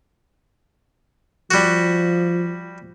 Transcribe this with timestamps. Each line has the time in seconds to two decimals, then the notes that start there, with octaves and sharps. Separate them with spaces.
1.51 F3 G3 F#4